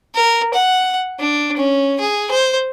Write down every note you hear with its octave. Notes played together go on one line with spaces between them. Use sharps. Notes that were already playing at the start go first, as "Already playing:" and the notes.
A#4
F#5
D4
C#4
G#4
C5